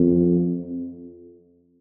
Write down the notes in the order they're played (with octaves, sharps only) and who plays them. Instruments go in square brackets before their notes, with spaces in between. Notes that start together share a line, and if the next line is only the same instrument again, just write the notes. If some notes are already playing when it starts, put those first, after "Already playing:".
Already playing: [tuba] F2